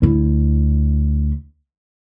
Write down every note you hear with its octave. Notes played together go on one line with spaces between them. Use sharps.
D2 E4